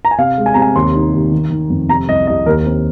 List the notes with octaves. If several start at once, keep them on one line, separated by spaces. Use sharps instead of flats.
A#5
G#5
C3 F5
G#3
G#5
C3 A#5
G#5
D#2 C6
D#4
D#2
D#3
D#3
F2
C3 A#5
C2 D#5
C2 D#5
D#2 A#4
C4